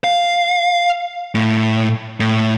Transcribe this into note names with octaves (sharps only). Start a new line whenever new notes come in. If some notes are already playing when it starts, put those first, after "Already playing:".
F5
A2
A2